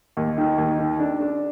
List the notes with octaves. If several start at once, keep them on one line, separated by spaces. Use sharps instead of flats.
D#2
D#3
D#2
D#3
D4
D4